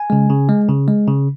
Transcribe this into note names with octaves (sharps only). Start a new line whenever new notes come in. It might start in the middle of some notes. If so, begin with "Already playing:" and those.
Already playing: G#5
C#3 G#3
C#3
G#3
C#3
G#3
C#3